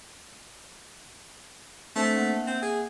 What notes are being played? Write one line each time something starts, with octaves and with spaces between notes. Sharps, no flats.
A3 C4 D4 C5
A#3 E5 F#5
C4
G#4